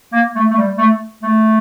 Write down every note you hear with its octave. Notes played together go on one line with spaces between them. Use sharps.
A#3
A3
A3
G3
A3
A3